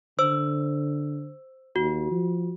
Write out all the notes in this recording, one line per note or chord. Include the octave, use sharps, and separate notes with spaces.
D3 C5 E6
D#2 F#4
F3